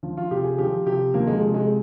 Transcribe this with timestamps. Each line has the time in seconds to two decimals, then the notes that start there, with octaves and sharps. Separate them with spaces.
0.03 F3
0.17 F4
0.31 C3 G4
0.44 G#4
0.58 F3 G4
0.86 C3 G4
1.14 F3 A#3
1.27 G#3
1.40 C3
1.54 G#3